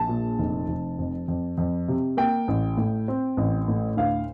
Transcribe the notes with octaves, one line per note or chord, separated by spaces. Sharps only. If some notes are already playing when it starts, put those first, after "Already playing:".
Already playing: A#1 A5
A#2
F1
F1
F2
F2
F2
C3
A#3 G5
A1
A2
C4
A1
A2
D2 F5